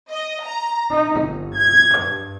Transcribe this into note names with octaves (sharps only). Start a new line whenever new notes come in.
D#5
A#5
D#4
G1
G#6
G2